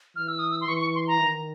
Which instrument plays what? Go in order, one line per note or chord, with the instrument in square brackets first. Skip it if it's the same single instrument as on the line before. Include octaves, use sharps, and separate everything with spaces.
[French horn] E3 [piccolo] F6
[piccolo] E6
D#6
E6
C6
[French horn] E3 [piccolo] C#6
[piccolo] C#6
C6
A#5
[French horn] D#3